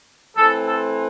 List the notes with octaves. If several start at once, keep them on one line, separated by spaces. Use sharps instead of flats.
E3 A3 C4 A4
A4